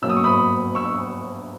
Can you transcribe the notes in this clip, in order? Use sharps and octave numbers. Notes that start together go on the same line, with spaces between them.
B2 F#3 A#3 C#4 E6
D#6
C#6
B5 D#6
C#6 E6